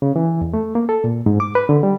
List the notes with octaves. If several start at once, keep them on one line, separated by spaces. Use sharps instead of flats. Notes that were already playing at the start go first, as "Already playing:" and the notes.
C#3
E3
E2
A3
A#3
A4
A#2
G#2
D6
B4
D3
G3